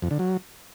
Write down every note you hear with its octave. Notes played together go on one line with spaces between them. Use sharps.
F2
D3
F#3